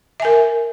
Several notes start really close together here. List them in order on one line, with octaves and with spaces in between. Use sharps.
E5 G#5 A#4